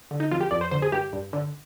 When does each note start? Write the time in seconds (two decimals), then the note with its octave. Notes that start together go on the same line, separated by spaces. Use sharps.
0.11 D3
0.20 D#4
0.31 F2 F4
0.41 G4
0.51 F2 D5
0.61 C5
0.71 D3 C5
0.82 G#4
0.92 G2 G4
1.13 G2
1.33 D3